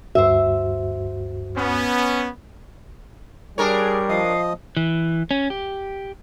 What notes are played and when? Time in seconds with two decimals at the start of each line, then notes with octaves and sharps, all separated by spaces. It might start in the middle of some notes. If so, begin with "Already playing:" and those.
0.15 D2 G2 F#4 C5 E5
1.56 B3 C#4
3.58 G3 D4 G#4 A#4 C#5
4.09 F3 D#5 F5 D#6
4.77 E3
5.31 C#4
5.50 G4